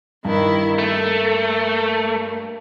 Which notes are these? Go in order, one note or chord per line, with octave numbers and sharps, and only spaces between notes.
G2 D#3 E4
A3 A#3